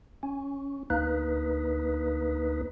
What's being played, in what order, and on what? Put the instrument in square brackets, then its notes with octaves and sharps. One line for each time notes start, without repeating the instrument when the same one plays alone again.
[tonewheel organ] C#4
D2 A#3 D#4 B4